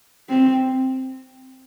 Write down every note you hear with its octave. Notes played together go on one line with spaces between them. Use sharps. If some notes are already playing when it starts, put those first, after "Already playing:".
C4